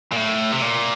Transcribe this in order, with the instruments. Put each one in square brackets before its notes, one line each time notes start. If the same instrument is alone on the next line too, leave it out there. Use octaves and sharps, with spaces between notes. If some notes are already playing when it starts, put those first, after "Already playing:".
[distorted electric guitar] A#2
A2
C3
A#2